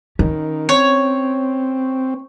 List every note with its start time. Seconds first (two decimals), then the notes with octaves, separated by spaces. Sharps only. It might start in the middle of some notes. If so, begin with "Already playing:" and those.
0.19 D#3 C#4
0.69 C4 C#5